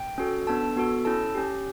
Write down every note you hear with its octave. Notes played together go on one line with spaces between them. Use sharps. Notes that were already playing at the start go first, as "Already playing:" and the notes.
Already playing: G5
C#4 F#4 A4
B3 D4 A4 A5
B3 F#4 A4
C#4 E4 A4 A5
C#4 G4